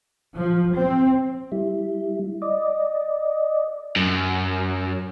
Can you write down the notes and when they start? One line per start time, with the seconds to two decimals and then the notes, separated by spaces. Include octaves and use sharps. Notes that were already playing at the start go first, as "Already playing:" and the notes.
0.35 F3
0.76 C4
1.52 G3 E4
2.42 D5 D#5
3.96 F#2